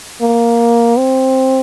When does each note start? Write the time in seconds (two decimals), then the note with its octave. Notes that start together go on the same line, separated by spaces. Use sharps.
0.21 A#3
0.98 C4